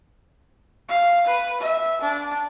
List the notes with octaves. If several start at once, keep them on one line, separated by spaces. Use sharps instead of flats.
F5
B4
E5
D4